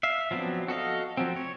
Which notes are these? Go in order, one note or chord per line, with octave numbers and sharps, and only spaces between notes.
E5 F5
F3 F#3 B3 C4 D4
F#4 A4 D#5 F5
F3 F#3 C4
C#5